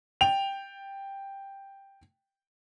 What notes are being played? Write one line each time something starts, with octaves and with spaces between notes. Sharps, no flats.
G5 F7